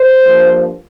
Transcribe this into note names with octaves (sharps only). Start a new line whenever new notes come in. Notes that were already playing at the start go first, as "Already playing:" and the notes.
Already playing: C5
G2 F3 A#3